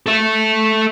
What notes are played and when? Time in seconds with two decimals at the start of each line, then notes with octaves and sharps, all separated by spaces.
0.06 A4 E5